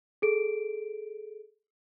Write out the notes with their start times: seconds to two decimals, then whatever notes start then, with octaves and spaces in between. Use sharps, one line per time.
0.22 G#4 A4 D7